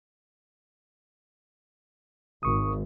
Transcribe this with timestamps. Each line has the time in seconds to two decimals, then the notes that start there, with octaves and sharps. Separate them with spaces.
2.43 G#1 C#6 D#6